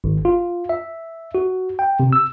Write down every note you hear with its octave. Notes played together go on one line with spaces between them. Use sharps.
G#1
F4
E5
F#4
G5
C3
E6